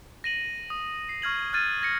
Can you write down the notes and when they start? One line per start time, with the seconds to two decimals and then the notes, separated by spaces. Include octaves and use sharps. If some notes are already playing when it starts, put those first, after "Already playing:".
0.24 A#6 D#7 F#7
0.70 D#6
1.09 C7
1.22 C#6 F6 G#6 F#7
1.53 F6 F#6 G#6 A6 D#7
1.82 G#6 A#6 C#7